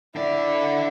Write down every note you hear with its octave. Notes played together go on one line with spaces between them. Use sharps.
D3 E4 D5